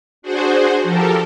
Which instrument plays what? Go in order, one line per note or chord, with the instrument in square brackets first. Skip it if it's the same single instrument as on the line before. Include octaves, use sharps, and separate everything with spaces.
[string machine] D4 F#4 G#4 C5
F3 G4 A4 A#4